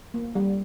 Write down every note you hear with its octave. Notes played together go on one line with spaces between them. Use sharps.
A#3
G3